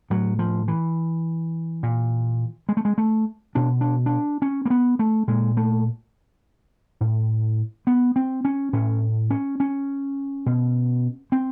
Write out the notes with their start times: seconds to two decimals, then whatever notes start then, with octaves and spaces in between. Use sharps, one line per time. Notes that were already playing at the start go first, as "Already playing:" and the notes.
0.10 A2 F#3
0.39 F3
0.68 E3
1.83 A#2
2.69 G#3
2.77 A3
2.85 G#3
2.98 A3
3.55 B2 D4
3.81 D4
4.06 D4
4.42 C#4
4.66 A#3
4.70 B3
4.99 A3
5.28 A#2 G#3
5.57 A3
7.01 A2
7.87 B3
8.16 C4
8.45 C#4
8.73 A2 C#4
9.31 C#4
9.60 C#4
10.46 B2
11.32 C4